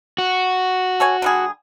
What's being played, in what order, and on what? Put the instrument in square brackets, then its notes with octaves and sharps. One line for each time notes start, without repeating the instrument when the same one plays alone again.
[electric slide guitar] F#4
[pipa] A4 C#5 G#5
D3 G3 G#4